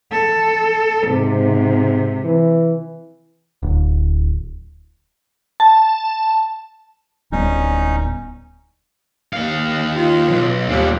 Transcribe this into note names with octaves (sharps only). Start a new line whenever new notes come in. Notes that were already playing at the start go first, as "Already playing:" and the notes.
A4
G#2 C3
E3
D1
A5
D1 G3 B3 C#4 D#4
D#2 F5
F4
B1
D#2 A#2 G3